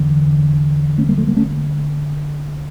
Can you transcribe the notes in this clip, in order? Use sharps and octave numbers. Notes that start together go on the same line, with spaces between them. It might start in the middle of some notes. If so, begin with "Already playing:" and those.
Already playing: E2 D3
A3 C#4
G3 A#3
F3 A3
G3 A#3
D3 A3 C#4